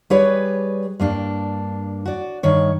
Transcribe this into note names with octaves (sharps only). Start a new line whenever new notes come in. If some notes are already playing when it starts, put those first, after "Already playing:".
G3 G#4 B4 C#5 D5
G2 A#3 D4
F#4 D5
G2 D#3 C#5